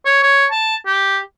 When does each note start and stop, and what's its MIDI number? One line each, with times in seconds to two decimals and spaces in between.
0.06 0.19 73
0.23 0.45 73
0.51 0.76 81
0.86 1.19 67